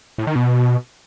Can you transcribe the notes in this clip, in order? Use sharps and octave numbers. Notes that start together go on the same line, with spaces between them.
A2
D#3
B2